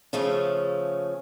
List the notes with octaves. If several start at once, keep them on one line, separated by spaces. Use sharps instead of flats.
C#3 F3 A3 C#4